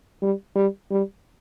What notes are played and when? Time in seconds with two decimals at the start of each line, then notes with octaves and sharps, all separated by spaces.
0.22 G3
0.56 G3
0.91 G3